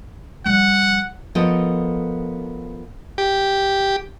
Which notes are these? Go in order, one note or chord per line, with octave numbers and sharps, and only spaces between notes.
F3 G3 F#5
F3 B3 A4 A#4 D#5
G4